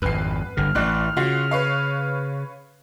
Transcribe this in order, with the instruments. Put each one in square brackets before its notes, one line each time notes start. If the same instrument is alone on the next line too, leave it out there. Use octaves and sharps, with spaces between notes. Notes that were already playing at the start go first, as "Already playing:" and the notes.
[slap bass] G#1 F2 [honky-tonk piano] B4 C7
[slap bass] G1 D3 [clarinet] F6
[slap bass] A1 E3 [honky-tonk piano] D5 F#6
[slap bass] C#3 [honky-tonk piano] F4 F#4
[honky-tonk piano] B4 C#5 F5